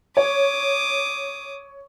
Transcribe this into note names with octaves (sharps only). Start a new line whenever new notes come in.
C#5 D6 D#6